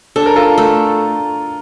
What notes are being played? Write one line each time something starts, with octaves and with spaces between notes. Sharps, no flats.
D4 A4
A#4
F4 A4
A3